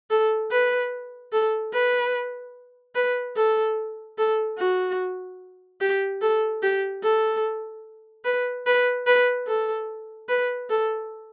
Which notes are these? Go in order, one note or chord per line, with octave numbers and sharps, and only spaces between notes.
A4
B4
A4
B4
B4
A4
A4
F#4
G4
A4
G4
A4
B4
B4
B4
A4
B4
A4